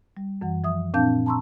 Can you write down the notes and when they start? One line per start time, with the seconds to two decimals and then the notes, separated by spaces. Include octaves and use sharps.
0.17 G3
0.41 F#2 E3 F#5
0.64 F3 E5 D#6
0.94 A#2 C4 D4 F5 A5 G6
1.26 A5 A#5 C6 C#6 E6